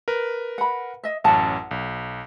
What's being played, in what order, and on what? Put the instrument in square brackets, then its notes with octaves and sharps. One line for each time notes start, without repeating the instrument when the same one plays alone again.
[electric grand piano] A#4 B4
[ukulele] F#5 B5
D#5 E5
[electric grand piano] A1 F#2 [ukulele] F#5 A5
[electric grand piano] B1